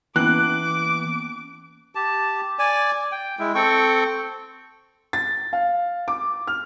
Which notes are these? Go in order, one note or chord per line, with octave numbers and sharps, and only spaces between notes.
E3 A#3 B3 C#4 D6 F#6
G4 A5
D5 G#5
G5
G#3 E4
C4 A4 G5 C#6
A6
F5
D6
F6